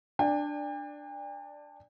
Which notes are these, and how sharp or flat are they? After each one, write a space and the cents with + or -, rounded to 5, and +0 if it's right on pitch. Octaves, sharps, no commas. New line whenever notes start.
D4 +10 D5 +0 G5 +45